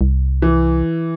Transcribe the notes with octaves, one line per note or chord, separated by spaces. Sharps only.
C2
E3